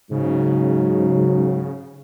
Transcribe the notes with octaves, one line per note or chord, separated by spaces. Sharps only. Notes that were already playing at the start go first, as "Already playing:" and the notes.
G#2 C#3 F#3